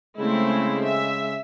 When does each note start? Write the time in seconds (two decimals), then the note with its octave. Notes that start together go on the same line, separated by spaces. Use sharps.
0.18 C#3 G#3 A3 C4 E4
0.84 E5